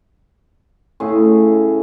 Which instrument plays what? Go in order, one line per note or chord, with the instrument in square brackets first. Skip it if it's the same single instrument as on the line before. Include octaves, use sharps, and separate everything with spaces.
[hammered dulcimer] A2 C#3 G#4